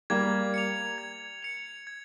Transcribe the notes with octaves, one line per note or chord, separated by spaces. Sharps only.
G3 A#3 G#6
C#7 F7
G#6
C#7 F7
G#6